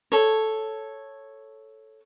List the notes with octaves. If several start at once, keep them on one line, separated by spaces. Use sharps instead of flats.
A4 C#5